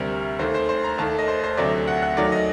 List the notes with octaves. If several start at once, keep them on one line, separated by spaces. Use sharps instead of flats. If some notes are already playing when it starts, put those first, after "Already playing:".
Already playing: D2 C3 G3 A#4
D#2 D#3 A3 C5
C5
C5
A#5
D#2 D#3 A3 A5
D#5
C5
C5
D2 C3 F#3 A3 D5
F#5
F#5
D#2 D#3 F#3 A3 D5
D#5